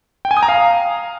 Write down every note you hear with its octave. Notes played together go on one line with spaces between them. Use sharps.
G5
G#5
D#6
A#5
F5